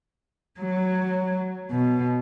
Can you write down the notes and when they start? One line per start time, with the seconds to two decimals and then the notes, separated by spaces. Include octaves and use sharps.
0.60 F#3
1.71 B2